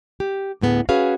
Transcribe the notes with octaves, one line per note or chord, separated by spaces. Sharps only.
G4
D2 A2 B3 G#4
C#4 F#4 G#4 B4 F5